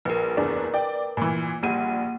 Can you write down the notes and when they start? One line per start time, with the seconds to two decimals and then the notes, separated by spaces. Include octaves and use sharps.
0.05 A#1 A#4 B4
0.37 F#1 E2 D4
0.74 D5 G5
1.17 A#2 E3
1.63 A#1 G3 A#3 F#5 D#7